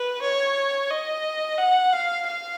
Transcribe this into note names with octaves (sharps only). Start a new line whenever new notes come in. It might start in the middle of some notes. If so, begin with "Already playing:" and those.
Already playing: B4
C#5
D#5
F#5
F5
F5